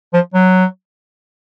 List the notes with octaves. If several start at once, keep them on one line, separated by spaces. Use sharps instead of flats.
F3
F#3